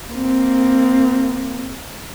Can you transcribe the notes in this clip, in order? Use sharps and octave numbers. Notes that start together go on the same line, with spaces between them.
A#3 C4